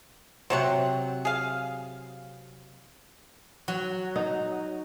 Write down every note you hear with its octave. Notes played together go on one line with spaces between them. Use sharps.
C3 F#3 C5 C#5 F#5
G#4 F5
F#3
D#4